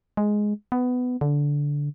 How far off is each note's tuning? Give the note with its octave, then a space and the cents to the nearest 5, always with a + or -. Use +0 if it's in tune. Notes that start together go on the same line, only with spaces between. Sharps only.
G#3 +5
B3 +15
D3 -15